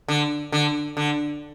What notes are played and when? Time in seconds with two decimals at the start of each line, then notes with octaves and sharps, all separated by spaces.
0.08 D3
0.52 D3
0.97 D3